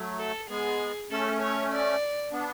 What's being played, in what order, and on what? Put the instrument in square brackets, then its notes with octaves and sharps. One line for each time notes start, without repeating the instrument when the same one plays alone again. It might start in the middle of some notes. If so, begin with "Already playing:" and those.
Already playing: [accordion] F#3 A3
[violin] A4
[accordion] G#3 B3 [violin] G#4
[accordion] A3 C#4 [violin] A4
[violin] C#5
D5
[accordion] B3 D4